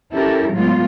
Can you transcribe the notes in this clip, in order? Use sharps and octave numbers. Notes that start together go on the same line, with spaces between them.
C#4 E4 G4 A4 A#4
A2 F#3 G#3 B3 F4